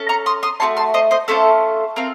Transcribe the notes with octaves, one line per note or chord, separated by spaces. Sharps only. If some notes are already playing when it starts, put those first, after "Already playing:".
Already playing: C#4 A4
A#5 C#6
C6 D#6
C6 D#6
A3 D#4 F#4 A5 C6
A5 C6
C5 D#5
C5 D#5
A3 C#4 F4 A4 C5
C4 F4 A#4